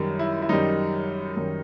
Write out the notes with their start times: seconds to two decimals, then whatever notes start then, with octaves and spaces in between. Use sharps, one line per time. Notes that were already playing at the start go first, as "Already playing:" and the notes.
Already playing: F#2 D#3 G3
0.19 E4
0.42 E4
0.49 F#2 D#3 G3 D#4
1.36 F#2 D#3 G3